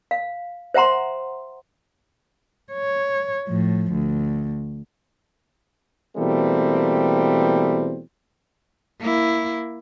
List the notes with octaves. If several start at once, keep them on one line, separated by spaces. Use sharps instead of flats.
F5
C5 E5 F#5 A#5 C6
C#5
A2 F3
D2
B2 E3 G3 A3 A#3 C4
A#3 E4